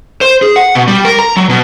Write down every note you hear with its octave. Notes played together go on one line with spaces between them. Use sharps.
C5
G#4
F#5
B2
G3
A#4
A#5
F#3
B2